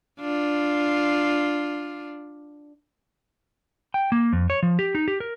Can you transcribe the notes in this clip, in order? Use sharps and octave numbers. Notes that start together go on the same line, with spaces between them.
D4 F4
G5
A#3
F2
C#5
F3
G4
D#4
G4
A#4